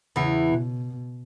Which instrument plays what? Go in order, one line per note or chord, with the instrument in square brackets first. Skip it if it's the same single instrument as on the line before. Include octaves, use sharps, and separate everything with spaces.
[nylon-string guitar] E2 E3 [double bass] C#3
[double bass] B2